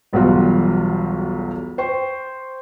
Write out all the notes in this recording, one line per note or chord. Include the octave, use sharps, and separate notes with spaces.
E1 B1 E2 G3 F4 F#4
C5 G5 C#6